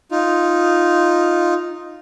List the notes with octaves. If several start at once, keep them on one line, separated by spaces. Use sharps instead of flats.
D#4 F4